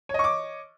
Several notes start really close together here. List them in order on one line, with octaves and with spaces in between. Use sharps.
C#5 D#5 C#6 D6